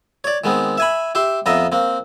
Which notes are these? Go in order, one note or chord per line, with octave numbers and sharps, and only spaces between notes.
C#5 D5
D#3 G#3 B3 C4
E5 G#5 B5
G4 E5 C6
F2 B3 D#5 E5 A#5
A#3 C4